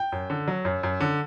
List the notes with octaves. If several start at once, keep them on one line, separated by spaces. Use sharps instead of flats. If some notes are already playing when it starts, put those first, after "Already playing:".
Already playing: G5
F#2
D3
F#3
F#2
F#2
D3